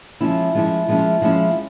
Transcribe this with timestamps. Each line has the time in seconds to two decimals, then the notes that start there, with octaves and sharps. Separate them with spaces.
0.21 F3 G#3 C#4 E4
0.55 F3 G#3 C#4 E4
0.88 F3 G#3 C#4 E4
1.22 F3 G#3 C#4 E4